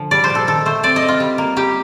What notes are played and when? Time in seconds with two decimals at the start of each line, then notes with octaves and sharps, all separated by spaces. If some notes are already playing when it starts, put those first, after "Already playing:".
Already playing: D3 F3
0.11 G3 D5
0.24 C5
0.30 A#2
0.35 A4
0.47 D#3 A4
0.66 A3 C5
0.83 C4 D5
0.96 D#5
1.02 C4
1.08 F4
1.20 G3
1.38 A#3
1.56 G3 G4